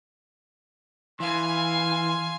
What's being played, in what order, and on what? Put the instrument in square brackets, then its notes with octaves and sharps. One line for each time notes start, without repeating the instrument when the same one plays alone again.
[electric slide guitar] E3 [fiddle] F5 G#5 [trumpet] C6